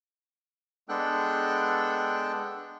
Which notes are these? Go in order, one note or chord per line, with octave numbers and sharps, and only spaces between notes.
G#3 B3 D4 A4 G5 F#6